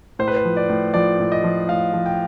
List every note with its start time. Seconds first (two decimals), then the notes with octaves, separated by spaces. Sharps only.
0.19 A2 C5
0.28 B4
0.36 C5
0.45 F3
0.57 D5
0.69 A2
0.94 F3 D5
1.20 A2
1.32 D#5
1.44 F3
1.68 A2 F5
1.94 F3
2.06 G5